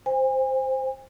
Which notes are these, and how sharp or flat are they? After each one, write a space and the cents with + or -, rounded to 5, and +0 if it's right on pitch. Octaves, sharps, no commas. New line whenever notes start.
C5 +0 G#5 -45